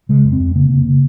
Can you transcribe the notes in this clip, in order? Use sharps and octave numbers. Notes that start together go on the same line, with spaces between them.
C#3 G#3
F2
C4
F2
C#3 A#3
C#3
C#3